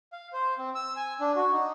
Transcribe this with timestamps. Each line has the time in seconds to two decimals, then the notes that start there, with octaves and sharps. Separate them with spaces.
0.13 F5
0.33 C5
0.58 C4
0.75 E6
0.96 G#5
1.20 D4
1.36 F#4
1.52 D#4